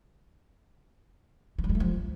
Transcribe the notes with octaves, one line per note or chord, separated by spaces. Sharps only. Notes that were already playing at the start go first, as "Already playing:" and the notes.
F3
F#3
G3
A3
F3